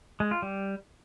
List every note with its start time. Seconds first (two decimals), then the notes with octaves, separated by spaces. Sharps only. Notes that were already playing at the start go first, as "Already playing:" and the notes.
0.20 G#3
0.31 F4
0.42 G3